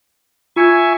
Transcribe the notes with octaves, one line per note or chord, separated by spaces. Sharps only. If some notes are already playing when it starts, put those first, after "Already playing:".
F4 E5 G#5 C#6 G#6